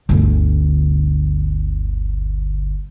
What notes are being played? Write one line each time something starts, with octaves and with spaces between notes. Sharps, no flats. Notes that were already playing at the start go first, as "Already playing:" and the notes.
G1 D2